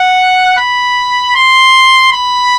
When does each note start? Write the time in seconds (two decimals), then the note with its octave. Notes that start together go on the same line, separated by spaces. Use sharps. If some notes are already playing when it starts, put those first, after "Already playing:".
Already playing: F#5
0.58 B5
1.35 C6
2.12 B5